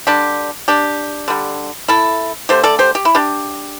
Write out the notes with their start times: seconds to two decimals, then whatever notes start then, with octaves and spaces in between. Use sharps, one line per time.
0.07 D3 G3 D4 G4
0.68 D4 G4
1.28 D3 G3
1.88 E4 A4
2.49 D3 A3 G4 C5
2.64 A4 D5
2.79 G4 C5
2.95 G4
3.05 E4
3.15 D4 G4